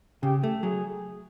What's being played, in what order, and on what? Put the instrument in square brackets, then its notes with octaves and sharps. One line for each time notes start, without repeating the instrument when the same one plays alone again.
[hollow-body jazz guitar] C#3 [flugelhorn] G4
[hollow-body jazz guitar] A3
[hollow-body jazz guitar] F#3 [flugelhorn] G#4